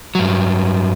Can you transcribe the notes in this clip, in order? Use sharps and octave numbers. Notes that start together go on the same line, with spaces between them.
G2 F#3